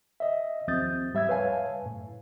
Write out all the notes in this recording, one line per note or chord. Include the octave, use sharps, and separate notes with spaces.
D#5 E5
D#2 F3 C4 D#6 G6 A6
G#2 G3 E5 E6 G#6
B4 C#5 F5 G#5 A5
F#2 A2